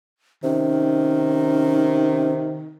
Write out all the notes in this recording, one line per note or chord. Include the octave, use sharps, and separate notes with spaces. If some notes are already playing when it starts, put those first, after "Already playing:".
C3 D#3 C#4